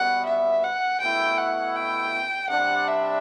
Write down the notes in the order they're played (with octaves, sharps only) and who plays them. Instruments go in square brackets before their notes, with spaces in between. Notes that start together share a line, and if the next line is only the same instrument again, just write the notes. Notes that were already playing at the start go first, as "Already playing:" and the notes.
Already playing: [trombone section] B2 G3 B3 [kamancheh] F#5
[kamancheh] E5
F#5
[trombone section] B2 A3 E4 [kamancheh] G5
[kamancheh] F#5
G5
[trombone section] C3 G3 D4 [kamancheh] F#5
[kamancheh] E5